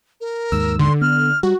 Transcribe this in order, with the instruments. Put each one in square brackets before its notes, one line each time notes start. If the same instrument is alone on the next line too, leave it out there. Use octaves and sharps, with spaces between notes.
[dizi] A#4
[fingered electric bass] D#2 G#2 [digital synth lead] E6
[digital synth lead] D3 [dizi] C6
[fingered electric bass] B3 [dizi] F6
[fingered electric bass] G3 [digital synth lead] F#4